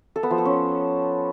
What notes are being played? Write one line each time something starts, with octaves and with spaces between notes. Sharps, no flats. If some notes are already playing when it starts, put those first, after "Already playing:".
A4
B3
F3
A4
C#4